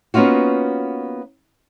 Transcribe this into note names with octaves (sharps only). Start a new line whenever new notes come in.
A#3 B3 C#4 D#4 F4 F#4